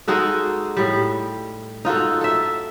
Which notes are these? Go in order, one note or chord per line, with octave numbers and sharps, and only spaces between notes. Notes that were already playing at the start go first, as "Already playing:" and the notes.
G#3 D#4 F#4 A4
A2 G3
D#4 F4 F#4 A4
A4 E5